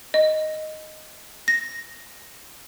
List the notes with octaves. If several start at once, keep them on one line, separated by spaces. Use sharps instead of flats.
D#5
A#6